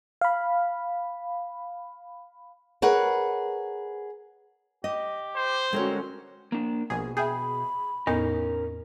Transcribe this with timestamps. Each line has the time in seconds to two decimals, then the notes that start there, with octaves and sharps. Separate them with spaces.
0.21 F5 B5
2.82 G#4 A#4 B4 C#5 F#5
4.84 G4 D#5
5.36 C5
5.73 D3 G#3 C4 C#4 F#4 A#4 C#5
6.52 A#3 D4
6.90 A#1 B2 G#4
7.17 G#4 E5 G5 B5 G6
8.07 E2 A2 B3 C#4 D#4 A#4